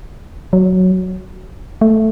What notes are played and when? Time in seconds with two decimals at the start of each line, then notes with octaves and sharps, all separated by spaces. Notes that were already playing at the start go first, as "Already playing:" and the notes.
0.53 F#3
1.81 A3